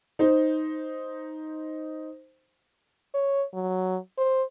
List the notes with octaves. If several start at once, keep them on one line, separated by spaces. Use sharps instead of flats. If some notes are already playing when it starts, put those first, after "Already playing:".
D#4 C5
C#5
F#3
C5